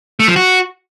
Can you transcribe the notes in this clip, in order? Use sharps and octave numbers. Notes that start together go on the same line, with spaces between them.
A3
F3
F#4